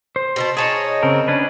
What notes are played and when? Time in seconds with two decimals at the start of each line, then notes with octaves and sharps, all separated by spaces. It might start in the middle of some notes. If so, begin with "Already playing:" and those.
0.16 C5
0.36 B2 C4 A5
0.57 D#4 G#4 C#5 D#5 A5
1.03 C#3 C4 A#4
1.28 C#4 D4 B4